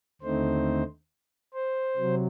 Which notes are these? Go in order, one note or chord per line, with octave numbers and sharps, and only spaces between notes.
D#2 D3 A3 C4 D#4 C5
C5
C3 F#3